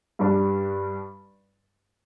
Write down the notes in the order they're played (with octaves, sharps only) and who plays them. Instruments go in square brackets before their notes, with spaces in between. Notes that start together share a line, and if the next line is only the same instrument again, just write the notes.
[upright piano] G2 G3 D4